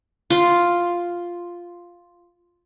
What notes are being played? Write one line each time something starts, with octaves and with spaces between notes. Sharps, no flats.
F4 C6